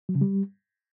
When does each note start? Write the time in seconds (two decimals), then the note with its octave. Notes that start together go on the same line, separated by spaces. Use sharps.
0.09 F#3
0.15 C#3
0.21 G3